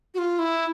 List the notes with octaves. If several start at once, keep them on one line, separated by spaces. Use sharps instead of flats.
F#4
F4
E4